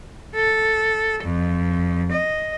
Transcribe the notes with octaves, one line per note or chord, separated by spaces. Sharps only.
A4
F2
D#5